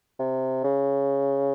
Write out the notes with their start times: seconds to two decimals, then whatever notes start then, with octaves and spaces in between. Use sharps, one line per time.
0.19 C3
0.64 C#3